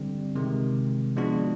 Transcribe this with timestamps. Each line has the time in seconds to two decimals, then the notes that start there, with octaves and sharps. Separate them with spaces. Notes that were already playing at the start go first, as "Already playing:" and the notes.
Already playing: D3 G3 C4
0.35 C3 D#3 G#3
1.16 F3 G#3 B3 D4 F#4